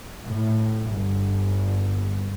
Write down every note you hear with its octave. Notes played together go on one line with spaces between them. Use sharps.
A2
G1